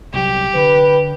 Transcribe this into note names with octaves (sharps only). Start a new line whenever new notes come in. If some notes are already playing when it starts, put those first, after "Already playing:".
C2 E3 F#3 G4
D3 B4